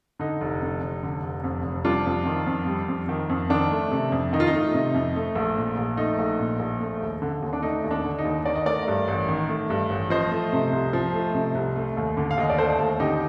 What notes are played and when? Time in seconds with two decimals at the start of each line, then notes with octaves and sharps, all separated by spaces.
0.19 D3 D#4
0.41 F1
0.61 F2
0.82 F1
1.03 D3
1.23 F1
1.44 F2
1.65 F1
1.85 G3 D4 F4
2.06 F2
2.26 D#3
2.47 F2
2.67 G3
2.88 F2
3.09 D#3
3.30 F2
3.50 D#3 D4
3.71 A3
3.91 C3
4.12 F2
4.33 D#3 D#4
4.40 F4
4.47 D#4
4.54 A3
4.74 C3
4.94 F2
5.16 A3
5.35 A#1
5.57 A#2
5.77 A#1
5.97 A3 D#4
6.19 A#1
6.39 A#2
6.59 A#1
6.80 A3
7.01 D#2
7.22 D3
7.42 D#2
7.53 D4
7.63 A3 D#4
7.84 D#2
7.91 D4
8.04 D3
8.18 D#4
8.25 D#2
8.46 D#3 D5
8.55 D#5
8.66 A3 A#4 D5
8.88 G2
9.08 A1
9.28 D#3
9.49 A3
9.70 G2
9.90 A1
10.10 F3 C5 D#5
10.32 A3
10.53 C3
10.72 C2
10.93 F3
11.14 A3
11.34 C3
11.55 C2
11.76 A3
11.97 D#2
12.17 D3
12.31 F5
12.38 D#2 D#5
12.50 D5
12.58 A3 A4 C5
12.79 D#2
12.99 D3 D#4 G4